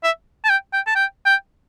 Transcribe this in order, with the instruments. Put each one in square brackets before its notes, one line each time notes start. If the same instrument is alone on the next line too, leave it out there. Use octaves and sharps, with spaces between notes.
[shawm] E5
A5
G5
G5
A5
G5
G5